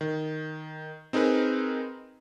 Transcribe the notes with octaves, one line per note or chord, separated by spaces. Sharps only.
D#3
C4 D#4 G#4 A#4 B4